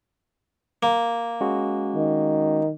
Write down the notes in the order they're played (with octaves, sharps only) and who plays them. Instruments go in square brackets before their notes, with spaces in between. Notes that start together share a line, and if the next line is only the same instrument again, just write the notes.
[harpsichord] A#3
[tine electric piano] G#3 C#4 F#4
[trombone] D#3